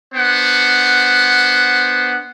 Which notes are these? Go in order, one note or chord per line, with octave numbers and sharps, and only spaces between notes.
B3 D4 C5 F#5